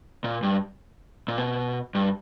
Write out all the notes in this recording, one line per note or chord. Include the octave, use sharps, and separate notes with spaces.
A#2
G2
A#2
B2
G2